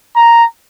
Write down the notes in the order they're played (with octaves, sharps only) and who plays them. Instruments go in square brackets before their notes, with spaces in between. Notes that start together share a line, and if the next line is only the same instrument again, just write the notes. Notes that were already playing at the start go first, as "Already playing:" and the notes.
[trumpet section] A#5